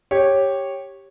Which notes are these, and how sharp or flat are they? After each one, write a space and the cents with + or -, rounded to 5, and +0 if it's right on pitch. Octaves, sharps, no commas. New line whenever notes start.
G4 +0 C#5 -10